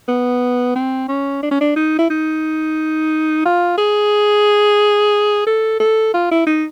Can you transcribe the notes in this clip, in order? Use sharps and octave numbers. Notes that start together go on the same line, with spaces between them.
B3
C4
C#4
D4
C#4
D4
D#4
E4
D#4
F4
G#4
A4
A4
F4
E4
D#4